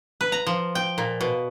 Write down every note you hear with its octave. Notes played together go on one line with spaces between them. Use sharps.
B4
A#5
F3
G5
A#2
B2